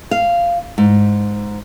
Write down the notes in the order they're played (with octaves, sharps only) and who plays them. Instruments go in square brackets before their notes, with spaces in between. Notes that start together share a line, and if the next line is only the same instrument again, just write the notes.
[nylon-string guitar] F5
G#2